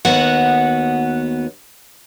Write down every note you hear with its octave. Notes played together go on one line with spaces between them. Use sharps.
D#2 B3 F#4 F#5